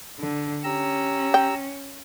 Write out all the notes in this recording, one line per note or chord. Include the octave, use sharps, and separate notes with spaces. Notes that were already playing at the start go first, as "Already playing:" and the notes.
D3
C#4 G4 A#5 E6
G5